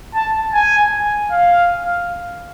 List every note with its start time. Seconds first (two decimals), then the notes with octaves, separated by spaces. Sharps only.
0.15 A5
0.54 G#5
1.31 F5